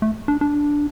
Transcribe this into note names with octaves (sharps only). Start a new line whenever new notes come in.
A3
D4
D4